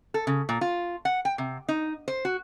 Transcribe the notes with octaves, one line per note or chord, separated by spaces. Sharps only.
A4
C#3
A#2
F4
F#5
G5
C3
D#4
C5
F#4